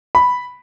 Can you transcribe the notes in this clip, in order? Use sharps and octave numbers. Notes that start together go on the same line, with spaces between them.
B5